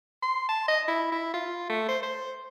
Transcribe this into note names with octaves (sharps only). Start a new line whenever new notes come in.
C6
A5
D#5
E4
E4
F4
A3
C5
C5